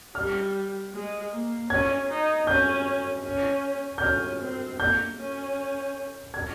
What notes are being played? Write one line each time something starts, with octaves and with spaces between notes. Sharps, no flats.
G3 F6
G#3
A#3
C#4 G#6
D#4
C#4 G6
C#4
G6
C#4 F6
C4
A#3 G6
C#4
G#6